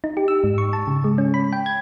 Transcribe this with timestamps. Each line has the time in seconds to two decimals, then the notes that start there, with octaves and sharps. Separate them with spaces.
0.04 D#4
0.17 G4
0.28 E6
0.44 G#2
0.58 C#6
0.73 A5
0.87 C#3
1.04 G#3
1.18 C#4
1.34 B5
1.53 G5
1.66 G#6